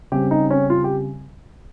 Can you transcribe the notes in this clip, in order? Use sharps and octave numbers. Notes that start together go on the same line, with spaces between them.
C#3 G3 C4 G4
D#4
C#4
F4
G4